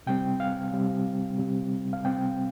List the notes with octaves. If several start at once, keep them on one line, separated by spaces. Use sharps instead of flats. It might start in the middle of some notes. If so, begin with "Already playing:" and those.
C3 G3 C4 G5
F5
C3 G3 C4
C3 G3 C4
F5
C3 G3 C4 G5